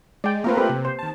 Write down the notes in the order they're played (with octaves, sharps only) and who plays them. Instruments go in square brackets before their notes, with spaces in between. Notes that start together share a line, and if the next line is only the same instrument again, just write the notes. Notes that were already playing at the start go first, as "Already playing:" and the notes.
[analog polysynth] G#3 [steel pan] D5 G5
[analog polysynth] A3 F4 A#4 [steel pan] A#3 C4 B4
[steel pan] C4 G4 B4
[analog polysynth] C3
[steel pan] C5
[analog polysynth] D#3 A5